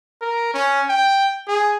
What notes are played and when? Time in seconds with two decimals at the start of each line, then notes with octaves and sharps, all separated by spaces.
0.21 A#4
0.54 C#4
0.89 G5
1.47 G#4